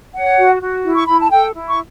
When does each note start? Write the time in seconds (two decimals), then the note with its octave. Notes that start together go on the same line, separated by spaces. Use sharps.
0.15 C#5 F#5
0.39 F#4
0.62 F#4
0.85 E4
0.95 C#6
1.06 E4 B5
1.19 A5
1.32 A4 G5
1.54 E4
1.68 C#6